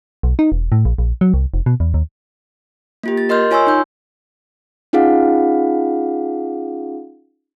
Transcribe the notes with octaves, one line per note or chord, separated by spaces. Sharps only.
B1
D#4
E1
A2
A#1
A#1
F#3
C2
F1
B2
E2
D#2
A#3 F4 G4
A6
A#4 D#5 C6 F6 G6
F4 C#5 G#5 C6 C#6 E6
D#4 G6
C#4 D#4 F4 G#4 F5 F#5